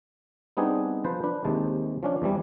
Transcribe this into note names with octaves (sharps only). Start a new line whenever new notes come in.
G3 B3 C4 D4 D#4 G#4
F3 B4 C5 A5
D4 B4
D#2 C3 G#3 A5
F3 C#4 D4
E2 E3 G3